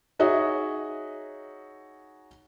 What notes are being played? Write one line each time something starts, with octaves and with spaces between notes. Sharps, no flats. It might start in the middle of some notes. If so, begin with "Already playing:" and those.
D#4 F#4 G#4 C#5 D#5 E5